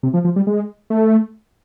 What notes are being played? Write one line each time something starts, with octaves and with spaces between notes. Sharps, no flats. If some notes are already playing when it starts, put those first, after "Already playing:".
C3
F3
F3
G3
G#3
A3